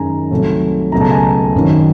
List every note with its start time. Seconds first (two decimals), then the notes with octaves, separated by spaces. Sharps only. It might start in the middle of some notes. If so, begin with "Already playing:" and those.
Already playing: F#2 D#3 G#3 G#5 A#5
0.31 C2 C3 D#3 F#3 A3
0.92 C#2 B2 F#3 A3 A#5
1.01 A5
1.11 G#5 A#5
1.55 G#1 F#2 D#3 F#3